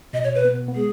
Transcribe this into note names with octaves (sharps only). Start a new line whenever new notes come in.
B2 D#5
C#5
B4
B3
B3
G#3 G#4